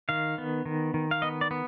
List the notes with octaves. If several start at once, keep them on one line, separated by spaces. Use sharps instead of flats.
D#3 F5
B3
D#3
D#3
F5
B3 D#5
D5
B3